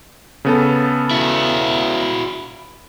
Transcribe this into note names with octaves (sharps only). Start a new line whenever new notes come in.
C#3 B3 A4
E4 F#4